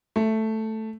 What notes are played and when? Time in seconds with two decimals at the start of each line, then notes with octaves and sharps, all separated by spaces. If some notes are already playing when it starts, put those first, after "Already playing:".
0.16 A3